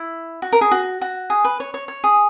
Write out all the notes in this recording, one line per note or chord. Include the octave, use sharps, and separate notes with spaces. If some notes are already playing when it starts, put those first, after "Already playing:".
Already playing: E4
F#4
A#4
G#4
F#4
F#4
G#4
B4
C#5
C#5
C#5
G#4